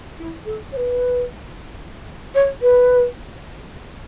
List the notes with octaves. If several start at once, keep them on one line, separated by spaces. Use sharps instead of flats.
E4
A4
C#5
B4
C#5
B4